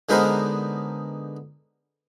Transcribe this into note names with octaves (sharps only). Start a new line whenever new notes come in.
D3 G#3 B3 D#4 A#4 C5